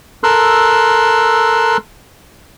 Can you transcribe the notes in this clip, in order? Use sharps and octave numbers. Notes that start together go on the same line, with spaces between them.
A4 A#4 C6 E6 F#6